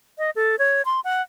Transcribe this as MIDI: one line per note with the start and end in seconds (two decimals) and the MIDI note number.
0.18 0.30 75
0.36 0.58 69
0.59 0.82 73
0.85 1.00 84
1.04 1.22 78